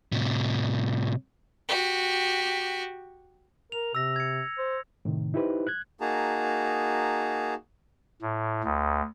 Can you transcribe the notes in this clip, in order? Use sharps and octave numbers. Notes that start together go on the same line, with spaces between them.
A2 C3
F#4 G4
A#4 F7
C3 E6 A#6
G#6 C#7
C5
A2 C3 D#3
D#4 E4 G4 B4 C5
F#6 G#6
A#3 D#4 F#4 G#4 A5 A#5
A2
D2